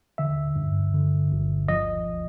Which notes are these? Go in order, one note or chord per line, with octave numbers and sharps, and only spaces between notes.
D3 E5
G2
D3
G1
F3 D#5